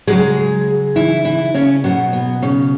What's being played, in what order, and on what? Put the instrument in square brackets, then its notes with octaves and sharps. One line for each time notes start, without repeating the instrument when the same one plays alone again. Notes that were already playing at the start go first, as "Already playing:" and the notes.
[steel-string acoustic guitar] C#3 F#3 G#3 G#4
E3 E4
E3 E4
C#3 C#4
B2 F#3 B3
B3
C#3 C#4